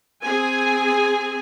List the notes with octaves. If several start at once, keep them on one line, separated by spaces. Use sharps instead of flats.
C4 G#4 G#5